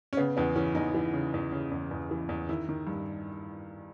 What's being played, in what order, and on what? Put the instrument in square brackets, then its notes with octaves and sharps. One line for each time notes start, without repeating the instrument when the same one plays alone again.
[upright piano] C#4
C#3 B3
E2 B3
E3 C#4
E2 D#4
E3
C#3
E2
C#3
E2
E2
E3
E2
D#3 E4
D#3
G2